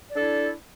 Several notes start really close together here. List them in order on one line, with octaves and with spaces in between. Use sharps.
D5 D4 A4 E4